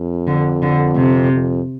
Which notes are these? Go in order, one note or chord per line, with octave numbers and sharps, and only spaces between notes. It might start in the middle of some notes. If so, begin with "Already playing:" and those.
Already playing: F2
D3
D3
C3
F2